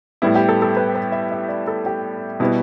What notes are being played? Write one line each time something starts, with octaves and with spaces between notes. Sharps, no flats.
A2 G3 B3 E4
G4
A4
A4
B4
B4
E5
E5
D5
A4
G4
B2 G3 B3 E4